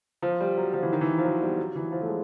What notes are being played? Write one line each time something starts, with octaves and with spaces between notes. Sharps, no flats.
F3
G3
F#3
F3
E3
D#3
E3
F3
F#3
G3
F#3
E3
F3
A3
G#3